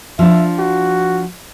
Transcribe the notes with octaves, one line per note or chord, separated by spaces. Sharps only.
F3 D4 E5
F#4